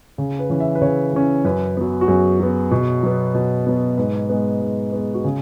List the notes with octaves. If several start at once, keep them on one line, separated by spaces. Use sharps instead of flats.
C#3
B4
E3 C#4
E5
B4
C#3 C#5
E3 C#4
F#2 B4
F#3 B3
F#4
F#2 G#4
F#3 B3
B2
F#3 B3
B2
F#3 B3
G#2 B4
G#3 B3
G#2
G#3 B3
F#4
C#3 G#4